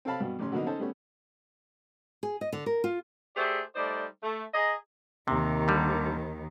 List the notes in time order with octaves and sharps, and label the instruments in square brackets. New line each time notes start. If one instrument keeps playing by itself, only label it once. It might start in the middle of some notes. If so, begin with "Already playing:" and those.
[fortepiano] C4 A4 C#5 F5 A5 B5
G2 B2 B3
A1 C#3 C#4 C6
D3 F#3 A#3 B3 D#4
C#4 D#4 A4 C5 C#5 A5
G3 A3 B3 C#4
[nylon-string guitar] G#4
D#5
D3
A#4
F4
[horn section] A3 G4 G#4 C5 D5 E5
G3 A3 D#4 C5 D5
A3
G#4 D#5 A#5
[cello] D#2 D#3 [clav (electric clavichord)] C3
[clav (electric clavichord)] D3 G3